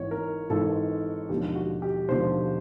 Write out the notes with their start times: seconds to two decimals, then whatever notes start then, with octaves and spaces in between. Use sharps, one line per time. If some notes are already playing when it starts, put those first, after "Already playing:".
Already playing: G#1 G#2 E3 C#5
0.11 A#4
0.50 G#1 G#2 E3 A4
1.29 E1 D#2 D3 F3 G#3 G4
1.56 F#4
1.82 G4
2.09 E1 D#2 D3 F3 G#3 C5